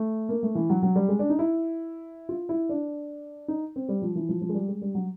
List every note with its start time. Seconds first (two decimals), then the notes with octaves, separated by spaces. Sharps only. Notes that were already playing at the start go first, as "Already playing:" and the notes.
Already playing: A3
0.29 A#3
0.43 A3
0.55 E3
0.70 F#3
0.83 F#3
0.96 G3
1.09 G#3
1.19 D4
1.30 D#4
1.39 E4
2.29 F4
2.49 E4
2.69 D4
3.48 D#4
3.76 C4
3.89 G3
4.02 F3
4.16 E3
4.29 F3
4.42 F3
4.49 G#3
4.54 G3
4.68 G#3
4.82 G3
4.95 F#3